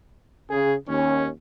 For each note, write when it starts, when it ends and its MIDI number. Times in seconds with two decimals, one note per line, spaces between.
0.49 0.74 49
0.49 0.74 68
0.87 1.28 39
0.87 1.28 61